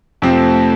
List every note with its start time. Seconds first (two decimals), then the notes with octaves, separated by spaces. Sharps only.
0.22 F2 C3 F3 A3 C4